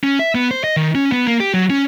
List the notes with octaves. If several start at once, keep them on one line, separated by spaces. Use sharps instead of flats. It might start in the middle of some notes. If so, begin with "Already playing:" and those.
C#4
E5
B3
C5
D#5
D#3
C#4
B3
A#3
G4
F#3
C#4